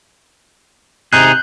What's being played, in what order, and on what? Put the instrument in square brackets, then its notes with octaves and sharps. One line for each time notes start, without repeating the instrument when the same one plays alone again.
[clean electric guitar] C3 D#4 G#4 [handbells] F#6 G6